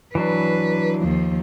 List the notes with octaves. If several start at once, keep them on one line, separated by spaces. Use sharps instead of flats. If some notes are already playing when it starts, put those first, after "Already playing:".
E3 F#3 D4 B4
D#2 F3